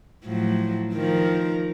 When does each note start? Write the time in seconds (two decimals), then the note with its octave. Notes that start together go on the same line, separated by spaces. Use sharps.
0.25 A2 F3 F#3
0.93 D#3 F3 A#4